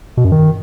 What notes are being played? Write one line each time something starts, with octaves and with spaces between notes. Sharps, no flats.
B2
F#2
D#3